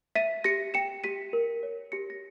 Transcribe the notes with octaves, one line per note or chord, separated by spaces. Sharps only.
E5 B6 D#7
G4 A#6 C#7
G5 C#7 E7
G4 B6 D#7
A#4
C#5
G4 A#6 C#7
A#6